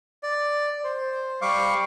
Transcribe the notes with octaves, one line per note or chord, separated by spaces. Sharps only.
D5
C5
G3 F5 C#6 D6